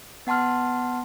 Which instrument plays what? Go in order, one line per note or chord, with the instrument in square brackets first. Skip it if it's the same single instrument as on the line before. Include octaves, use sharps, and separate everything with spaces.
[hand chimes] B3 F#5 A5 C6 F6